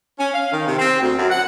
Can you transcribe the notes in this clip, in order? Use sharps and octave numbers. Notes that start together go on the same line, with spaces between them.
C#4
F5
D#3
C3
C4
D2
F#2
F#5